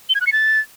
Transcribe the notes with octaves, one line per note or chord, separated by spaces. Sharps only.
G7
G#6
F#6
C#7
A6